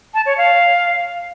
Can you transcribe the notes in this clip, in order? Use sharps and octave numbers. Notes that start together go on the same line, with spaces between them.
A5
C#5
F5